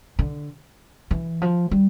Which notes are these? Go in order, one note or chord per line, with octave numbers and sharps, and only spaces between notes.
D3
E3
F3
G3